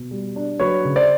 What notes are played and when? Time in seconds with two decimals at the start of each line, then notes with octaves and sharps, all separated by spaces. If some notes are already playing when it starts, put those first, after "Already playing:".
Already playing: B2
0.11 G3
0.36 D4
0.60 F#3 B4 C#5
0.85 C#3
0.96 C5 D5